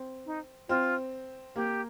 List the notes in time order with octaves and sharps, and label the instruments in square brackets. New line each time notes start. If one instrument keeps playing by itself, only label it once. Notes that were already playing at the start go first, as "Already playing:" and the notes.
Already playing: [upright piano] C4
[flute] D#4
[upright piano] C4 [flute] F4
[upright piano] A#3 [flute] G4